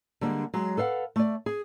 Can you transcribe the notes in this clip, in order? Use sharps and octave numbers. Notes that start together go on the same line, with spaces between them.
D3 G3 G#3 A#3 D4
F#3 G#3
A4 B4 F5 F#5
A3 D5
G#4